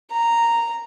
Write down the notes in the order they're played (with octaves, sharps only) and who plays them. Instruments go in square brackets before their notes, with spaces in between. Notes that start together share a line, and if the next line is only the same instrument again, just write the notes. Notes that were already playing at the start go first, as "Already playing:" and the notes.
[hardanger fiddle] A#5